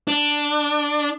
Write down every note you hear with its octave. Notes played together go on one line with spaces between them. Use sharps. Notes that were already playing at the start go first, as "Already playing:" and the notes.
D4